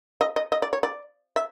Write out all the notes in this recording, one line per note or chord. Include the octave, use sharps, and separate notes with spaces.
D#5
D#5
D#5
D5
C#5
D5
E5